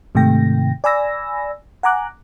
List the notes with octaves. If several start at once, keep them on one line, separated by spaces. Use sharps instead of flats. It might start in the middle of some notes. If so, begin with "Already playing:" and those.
G#2 C3 D#3 A3 G5 A#6
D5 G#5 B5 E6 A#6
F#5 G#5 A#5 D6 F#6